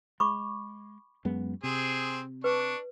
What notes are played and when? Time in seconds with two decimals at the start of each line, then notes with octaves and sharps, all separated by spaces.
0.20 G#3 B5 C#6 D6
1.25 F#2 G#3 B3
1.63 C3 C4 G#4
2.44 D4 B4 C#6